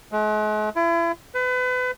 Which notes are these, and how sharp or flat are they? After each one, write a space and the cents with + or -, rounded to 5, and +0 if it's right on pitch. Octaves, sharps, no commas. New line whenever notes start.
G#3 +45
E4 +35
B4 +30